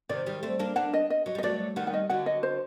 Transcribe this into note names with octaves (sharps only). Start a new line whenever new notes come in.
C3 D#3 D5
D#3 G3
A3 C4
A#3 D4
A#3 D4 F#5
D#5
D#5
F#3 D#5
G3
D#5
F#3 A3 D5
D#3 G3 F#5
F#5
D#5
D3 F#3 F#5
D#5
C5